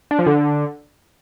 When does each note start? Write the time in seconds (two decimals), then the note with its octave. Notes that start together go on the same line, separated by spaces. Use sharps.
0.11 D4
0.19 F3
0.27 D3